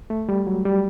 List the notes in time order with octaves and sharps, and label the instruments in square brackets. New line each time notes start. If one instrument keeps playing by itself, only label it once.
[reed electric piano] A3
G3
F#3
G3